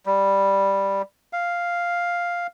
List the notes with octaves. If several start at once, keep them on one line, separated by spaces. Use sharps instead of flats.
G3
F5